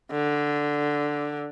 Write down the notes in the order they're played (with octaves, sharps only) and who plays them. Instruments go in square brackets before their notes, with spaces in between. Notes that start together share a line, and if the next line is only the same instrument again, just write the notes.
[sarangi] D3